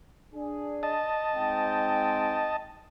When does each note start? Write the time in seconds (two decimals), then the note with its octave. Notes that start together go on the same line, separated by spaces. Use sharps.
0.34 D4 G#4
0.83 D#5 A5
1.33 G#2 C4 G5